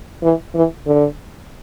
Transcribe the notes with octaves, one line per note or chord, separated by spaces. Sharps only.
E3
E3
D3